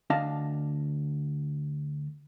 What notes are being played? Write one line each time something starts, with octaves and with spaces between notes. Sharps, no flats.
D2 D4 D#5 F5 A5